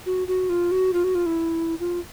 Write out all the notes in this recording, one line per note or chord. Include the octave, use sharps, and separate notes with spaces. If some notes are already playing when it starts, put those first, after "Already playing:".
F#4
F#4
F4
F#4
F4
F#4
F4
E4
F4